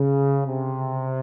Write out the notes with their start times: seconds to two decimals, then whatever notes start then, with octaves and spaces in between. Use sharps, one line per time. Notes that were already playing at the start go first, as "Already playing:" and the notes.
Already playing: C#3
0.46 C3